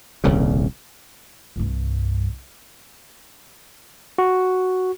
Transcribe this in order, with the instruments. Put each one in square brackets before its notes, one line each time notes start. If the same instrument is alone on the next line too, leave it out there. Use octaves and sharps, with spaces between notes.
[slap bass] D#1 C2 A#2 C#3
[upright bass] C2 G2
[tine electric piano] F#4